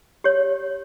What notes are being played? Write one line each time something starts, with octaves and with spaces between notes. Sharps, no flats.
G4 C#5